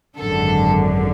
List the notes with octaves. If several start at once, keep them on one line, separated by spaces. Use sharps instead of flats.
G#1 F#2 D3 A4